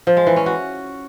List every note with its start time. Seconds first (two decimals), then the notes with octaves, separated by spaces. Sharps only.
0.07 F3
0.17 G#3
0.27 E3
0.36 C#4
0.46 F#4